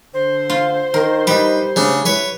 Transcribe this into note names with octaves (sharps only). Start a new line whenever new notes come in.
D3 C5
F4
D#3 A#4
G3 D#4 B4
C#3 A3 D4
E4 B4 C#5